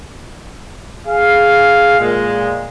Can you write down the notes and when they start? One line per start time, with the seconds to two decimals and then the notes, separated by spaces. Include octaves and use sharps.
1.07 G#4 F5
1.99 A#2 G#3